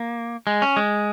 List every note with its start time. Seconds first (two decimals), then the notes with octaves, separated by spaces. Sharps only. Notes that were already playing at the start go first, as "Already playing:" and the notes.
Already playing: A#3
0.47 G#3
0.62 C#4
0.77 G#3